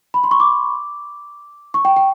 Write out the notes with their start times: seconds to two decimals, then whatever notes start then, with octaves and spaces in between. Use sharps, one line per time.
0.14 B5
0.24 C6
0.31 C#6
0.40 D6
1.74 C#6
1.85 G5
1.97 G5